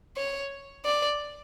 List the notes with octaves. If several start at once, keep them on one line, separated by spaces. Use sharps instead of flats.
C#5
D5